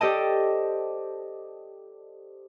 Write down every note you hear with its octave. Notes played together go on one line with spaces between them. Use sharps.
G4 A4 C5 D5 D#5 A5